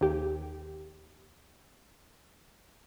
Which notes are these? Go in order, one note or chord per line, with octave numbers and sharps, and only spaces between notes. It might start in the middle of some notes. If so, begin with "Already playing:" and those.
D#2 G4